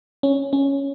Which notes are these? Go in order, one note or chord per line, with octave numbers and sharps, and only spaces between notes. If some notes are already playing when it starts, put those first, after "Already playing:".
C#4
C#4